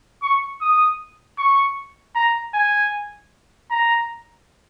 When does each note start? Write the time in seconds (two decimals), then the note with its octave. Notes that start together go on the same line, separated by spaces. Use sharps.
0.22 C#6
0.61 D#6
1.38 C#6
2.15 A#5
2.54 G#5
3.71 A#5